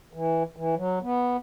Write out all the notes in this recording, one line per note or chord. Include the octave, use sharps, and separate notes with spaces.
E3
E3
F#3
B3